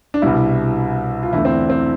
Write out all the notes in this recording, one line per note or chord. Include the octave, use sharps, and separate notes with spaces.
D4
C2 B2 G3 E4
F4
E2 D3 A3 E4
C4
D4
C4